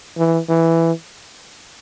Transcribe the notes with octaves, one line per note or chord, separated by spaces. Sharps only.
E3
E3